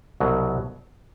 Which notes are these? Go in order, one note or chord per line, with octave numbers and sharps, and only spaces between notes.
C2 B2 F#3